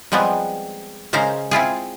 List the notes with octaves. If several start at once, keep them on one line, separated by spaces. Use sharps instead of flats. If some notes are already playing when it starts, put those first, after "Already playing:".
F3 G3 G#3 B3 C4
C#3 G#3 C#4 A#4 C5
C4 E4 F4 G#4